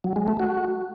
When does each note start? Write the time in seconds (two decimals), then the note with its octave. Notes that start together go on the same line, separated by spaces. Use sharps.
0.04 F#3
0.16 G#3
0.28 A3
0.40 F#4